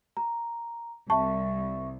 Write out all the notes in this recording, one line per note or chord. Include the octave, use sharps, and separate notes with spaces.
A#5
C2 E5 A5 C#6